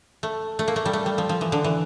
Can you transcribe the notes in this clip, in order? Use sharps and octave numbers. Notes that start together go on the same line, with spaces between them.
A3
A3
A#3
A3
G3
A3
G3
F3
F3
E3
D3
E3